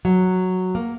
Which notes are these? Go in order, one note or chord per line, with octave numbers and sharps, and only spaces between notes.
F#3
A#3